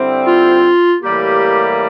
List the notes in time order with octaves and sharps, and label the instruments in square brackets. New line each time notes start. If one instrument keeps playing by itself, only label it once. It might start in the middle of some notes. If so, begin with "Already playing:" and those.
Already playing: [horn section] D3 G3 C4 E4
[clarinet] F4
[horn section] A2 E3 G3 A#3 [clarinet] G4